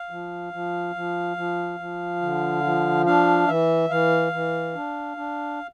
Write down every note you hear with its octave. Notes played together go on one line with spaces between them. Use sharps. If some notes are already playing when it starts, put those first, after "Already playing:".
Already playing: F5
F3
F3
F3
F3
F3
D3
F3
D4 F5
E3 E5
E3 F5
E3
D4
D4